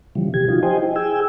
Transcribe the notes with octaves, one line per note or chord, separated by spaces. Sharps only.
C#3 E3 F3 G3
C3 G4 G#6
F3 D#4 F4 F#4
G4 C5 D#5 G5 G#5
E4
G#4 G5 G#5 E6